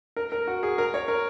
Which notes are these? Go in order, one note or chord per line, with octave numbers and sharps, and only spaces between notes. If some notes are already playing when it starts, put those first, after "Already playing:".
A#4
A#4
F#4
G#4
A#4
C#5
A#4